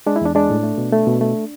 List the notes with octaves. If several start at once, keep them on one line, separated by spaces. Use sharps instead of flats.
G#3 D4
E4
E2 D4
G#3 D4
A2
A3
B2
A3
B2
A3